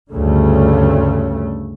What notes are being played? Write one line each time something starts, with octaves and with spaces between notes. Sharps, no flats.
D2 G2 C#3 A3